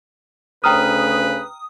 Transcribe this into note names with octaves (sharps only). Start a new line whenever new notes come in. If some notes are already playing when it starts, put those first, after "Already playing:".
D2 C#3 B4 G5 A#5 D#6 F6